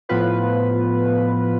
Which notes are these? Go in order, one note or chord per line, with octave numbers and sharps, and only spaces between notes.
A2 F3 B3 F4 B4